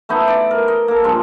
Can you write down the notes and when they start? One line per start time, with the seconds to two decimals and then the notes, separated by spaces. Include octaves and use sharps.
0.09 A3 B3 D#4 E4
0.28 D5
0.51 A#4
0.68 D#5
0.88 A#3 A4
1.04 G2 F3 G#3